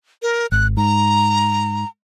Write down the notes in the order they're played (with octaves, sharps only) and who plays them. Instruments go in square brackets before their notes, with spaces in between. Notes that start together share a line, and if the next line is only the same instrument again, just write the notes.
[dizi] A#4
[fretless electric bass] G#1 [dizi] F#6
[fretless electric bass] G#2 [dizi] A#5